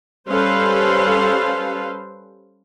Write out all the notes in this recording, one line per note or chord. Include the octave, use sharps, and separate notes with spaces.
G3 C#4 A4 B4 C5 F5